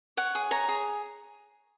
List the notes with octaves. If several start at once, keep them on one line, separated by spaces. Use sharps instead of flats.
C#5 F#5
G#4
C#5 A#5
G#4